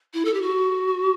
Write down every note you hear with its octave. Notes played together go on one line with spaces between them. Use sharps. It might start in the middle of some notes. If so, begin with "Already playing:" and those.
E4
A4
G4
F#4